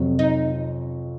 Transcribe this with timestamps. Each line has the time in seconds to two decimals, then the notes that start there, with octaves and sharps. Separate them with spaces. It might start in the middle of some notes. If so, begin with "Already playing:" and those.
Already playing: F2 C3 F#3
0.19 D#4